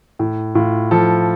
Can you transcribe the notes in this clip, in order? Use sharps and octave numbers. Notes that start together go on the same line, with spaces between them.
A2
A2 F4
F3 A4